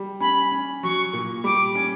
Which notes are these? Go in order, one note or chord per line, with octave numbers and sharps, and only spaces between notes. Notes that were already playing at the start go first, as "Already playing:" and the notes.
Already playing: G3
C#4 B5
C#4
F#3 C#6
A#2
G3 D6
C#4